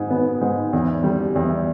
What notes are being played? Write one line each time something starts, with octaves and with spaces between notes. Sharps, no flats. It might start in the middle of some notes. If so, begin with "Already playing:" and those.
Already playing: G#2
B3
G#2
E2
G3
E2